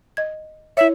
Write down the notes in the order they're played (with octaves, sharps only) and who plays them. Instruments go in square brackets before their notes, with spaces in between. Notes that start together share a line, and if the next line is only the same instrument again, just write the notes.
[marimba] D#5 G#6
[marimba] E4 C#5 [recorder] E5